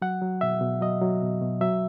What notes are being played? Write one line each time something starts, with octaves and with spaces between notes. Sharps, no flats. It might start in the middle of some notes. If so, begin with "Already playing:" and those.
F#3 F#5
F#3
B2 E5
B2
F#3 D#5
F#3
B2
B2
F#3 E5